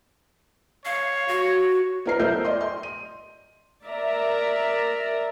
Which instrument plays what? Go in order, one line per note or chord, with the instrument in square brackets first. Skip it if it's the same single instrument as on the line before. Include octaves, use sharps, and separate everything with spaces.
[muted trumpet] C#5 [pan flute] F5
[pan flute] F#4
[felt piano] B3 A#4 C7
A3 A#4 C5 D#5 E6 G6
D5 D#5 C6
C6
D#7
[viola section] A#4 D5 E5 A#5